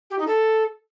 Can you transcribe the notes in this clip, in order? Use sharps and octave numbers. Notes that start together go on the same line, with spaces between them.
G4
D#4
A4